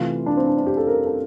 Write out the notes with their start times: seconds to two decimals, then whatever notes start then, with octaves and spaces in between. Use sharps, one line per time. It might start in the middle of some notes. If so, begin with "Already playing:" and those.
Already playing: C3 E3 A3 F4
0.26 D4
0.37 C4
0.47 D4
0.57 D4
0.66 G4
0.77 A4
0.87 A#4
1.06 A4